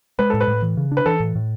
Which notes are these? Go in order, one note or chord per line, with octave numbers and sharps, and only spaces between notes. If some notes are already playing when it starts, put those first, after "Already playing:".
G#3 B4
A2 A4
B4
A2
E3
C#3
D4
B4
E3 A4
A2
A2